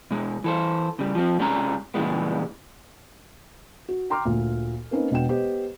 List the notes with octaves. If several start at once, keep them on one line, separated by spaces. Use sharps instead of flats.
B2 G#3
E3 A4 C5
C#3 G3
F3 C4
C2 G3 G#3 C#4 G5 A#5
A#2 C#3 E3 G3 G#3 B3
F#4
G5 A#5 C6 D6 F6
D2 A#2
A#3 C4 C#4 D#4 B4
E1 B2 D4 F#5 G5 E7
B3 G4 C5 D#5